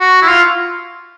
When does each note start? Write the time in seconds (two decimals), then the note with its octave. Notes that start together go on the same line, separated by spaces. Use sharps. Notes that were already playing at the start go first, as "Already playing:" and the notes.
0.01 F#4
0.22 E4
0.28 F4